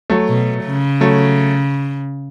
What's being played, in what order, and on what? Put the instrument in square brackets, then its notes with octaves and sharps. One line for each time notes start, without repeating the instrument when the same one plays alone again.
[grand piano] F#3 A3
[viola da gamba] B2
C#3
[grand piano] F#3 A3